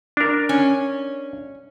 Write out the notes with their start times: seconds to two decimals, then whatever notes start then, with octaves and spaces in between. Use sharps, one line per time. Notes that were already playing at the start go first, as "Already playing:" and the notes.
0.17 D4 A#4
0.49 C#4